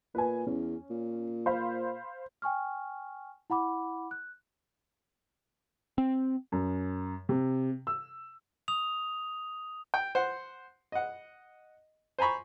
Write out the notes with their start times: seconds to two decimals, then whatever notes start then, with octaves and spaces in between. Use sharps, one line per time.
0.15 A#2 B4 G#5
0.47 E2 C#4
0.90 A#2
1.46 C5 F5 B5
2.42 G5 G#5 C#6 F6
3.50 E4 F#5 B5 D6
4.11 F#6
5.98 C4
6.52 F#2
7.29 C3
7.87 E6
8.68 D#6 F7
9.94 G5
10.15 C5 F#5
10.92 D#5 F#5
12.19 C5 G#5 A#5 B5 C#6